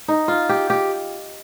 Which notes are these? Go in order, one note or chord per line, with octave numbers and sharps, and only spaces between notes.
D#4
F4
G4
G4